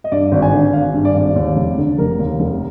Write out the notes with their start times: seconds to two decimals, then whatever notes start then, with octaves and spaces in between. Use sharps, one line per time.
0.04 D#5
0.12 G2 D5
0.32 G#1
0.42 G#5
0.52 D3
0.73 G#1 F5
0.94 G2
1.05 D5
1.15 G#1
1.36 D#2
1.56 F1
1.78 D3
1.98 F1 A#4
2.19 D#2
2.40 F1